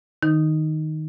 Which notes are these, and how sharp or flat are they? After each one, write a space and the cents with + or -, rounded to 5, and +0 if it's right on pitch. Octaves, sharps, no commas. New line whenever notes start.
D#3 +0 D#4 +0